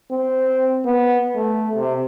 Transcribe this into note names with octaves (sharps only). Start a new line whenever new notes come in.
C4
B3
A3
C3